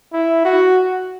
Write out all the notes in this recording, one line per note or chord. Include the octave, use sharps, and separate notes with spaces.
E4
F#4